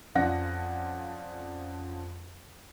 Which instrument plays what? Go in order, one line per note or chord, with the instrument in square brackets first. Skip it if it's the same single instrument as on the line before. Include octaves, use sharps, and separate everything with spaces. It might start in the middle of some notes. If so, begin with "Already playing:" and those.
[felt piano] F2 F3 C#4 D5 F#5 A#6